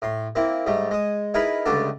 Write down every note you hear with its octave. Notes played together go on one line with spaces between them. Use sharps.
A2 C6
A#3 C4 E4
G#2 G3 A3
G#3 D#6
D#4 E4 G#4 A#4 B4 B5
C#2 D3 G3 A3 D4 A5